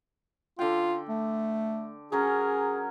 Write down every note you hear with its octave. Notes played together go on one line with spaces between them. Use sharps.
D3 F4 G5
A3
F#3 C#4 G#4 A#4